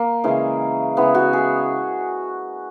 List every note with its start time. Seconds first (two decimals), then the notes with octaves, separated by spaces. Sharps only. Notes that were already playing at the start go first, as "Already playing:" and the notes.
Already playing: A#3
0.24 C#3 E3 G#3
0.97 C#3 E3 G#3 B3
1.14 F#4
1.33 G#4